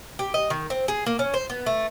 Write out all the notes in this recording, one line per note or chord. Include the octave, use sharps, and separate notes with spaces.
G4
D#5
D#3
C4
G#4
A#3
C#4
C5
B3
A3